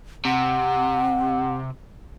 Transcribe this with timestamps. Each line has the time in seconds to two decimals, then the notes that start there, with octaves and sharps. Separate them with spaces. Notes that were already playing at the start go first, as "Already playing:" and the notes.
0.25 C3 F#5